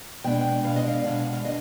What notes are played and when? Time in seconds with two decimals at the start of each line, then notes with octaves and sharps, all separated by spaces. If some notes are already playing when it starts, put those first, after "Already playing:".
0.24 B2 G#3 D4 G5
0.64 B2 G#3 D4 F5
0.76 D#5
0.88 F5
1.04 B2 G#3 D4 F5
1.33 F5
1.45 D4 D#5